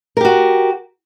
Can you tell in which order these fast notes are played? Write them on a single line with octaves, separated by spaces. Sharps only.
A#4 G4 F#4